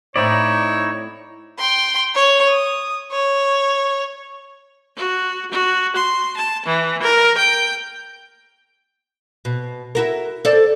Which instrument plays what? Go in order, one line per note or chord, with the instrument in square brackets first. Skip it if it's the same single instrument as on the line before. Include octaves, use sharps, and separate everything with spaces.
[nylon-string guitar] A2 C4 [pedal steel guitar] D#4 E4 D5 [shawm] C#5
[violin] G5 C6
C#5
D#6
C#5
[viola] F#4
F#4
C6
A5
E3
A#4
G5
[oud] B2
E4 F#4 A#4
A4 C5 D5